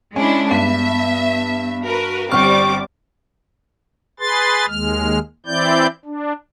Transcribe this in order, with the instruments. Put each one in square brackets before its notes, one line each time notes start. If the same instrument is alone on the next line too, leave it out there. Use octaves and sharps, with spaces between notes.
[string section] G#3 D4 E4 [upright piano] C#4
[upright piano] G2 [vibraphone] B3 [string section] E5
[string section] F#4 A#4 B4
[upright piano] G1 F6 [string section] G3 C4 D6 [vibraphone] C#6
[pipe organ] G#4 B4 C6 A6
D#2 G#3 F6
E3 C4 E4 D5 G6
D4